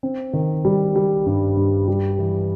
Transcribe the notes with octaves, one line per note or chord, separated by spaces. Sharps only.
C4
D#3
G3
G3
G2
G2
G3
E3